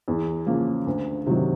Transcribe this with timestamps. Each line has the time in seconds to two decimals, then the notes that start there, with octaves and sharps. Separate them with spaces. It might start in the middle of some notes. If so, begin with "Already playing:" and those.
0.08 E2
0.46 C#3 F3 A#3
0.87 D2
1.27 C3 D#3 F#3